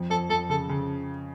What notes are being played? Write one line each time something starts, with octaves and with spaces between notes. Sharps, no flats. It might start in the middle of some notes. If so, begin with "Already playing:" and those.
Already playing: F2
F2 A4
F2 A4
C#3 A4
C#3